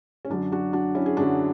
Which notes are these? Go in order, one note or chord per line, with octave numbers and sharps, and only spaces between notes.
C#4
F#2 D3 F#3 D4
D4 F#4
D4 F#4
C#4 E4
G#4
F#2 D3 F#3 D4 F#4